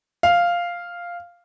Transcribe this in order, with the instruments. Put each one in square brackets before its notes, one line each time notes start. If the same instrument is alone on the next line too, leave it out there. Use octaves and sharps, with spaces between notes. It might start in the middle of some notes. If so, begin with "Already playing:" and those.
[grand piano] F5